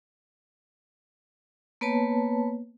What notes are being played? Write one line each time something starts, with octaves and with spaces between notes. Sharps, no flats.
A#3 B3 B4 C#5 A5